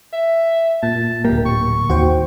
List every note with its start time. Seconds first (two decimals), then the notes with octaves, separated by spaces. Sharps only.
0.13 E5
0.83 A#2 A5
1.25 D1 A#3 G4
1.45 C#6
1.90 D#2 F#4 C5 G5